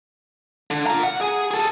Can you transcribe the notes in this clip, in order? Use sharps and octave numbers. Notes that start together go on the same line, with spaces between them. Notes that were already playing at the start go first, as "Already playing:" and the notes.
D3
F4 A#5
F#5
G#4
G#4 A4